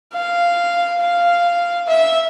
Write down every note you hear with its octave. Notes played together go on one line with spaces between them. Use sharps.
F5
F5
E5